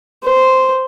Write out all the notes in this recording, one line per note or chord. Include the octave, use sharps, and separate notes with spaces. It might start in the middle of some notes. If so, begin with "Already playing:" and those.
C5